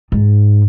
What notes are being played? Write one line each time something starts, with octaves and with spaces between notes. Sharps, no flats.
G#2